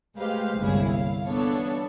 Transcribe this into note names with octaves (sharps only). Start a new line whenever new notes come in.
G#3 A3 G4 B4 C5 F5
G1 C2 A#3 C#4 E4 G#4
F5
E3 B3 D4 A4 C#5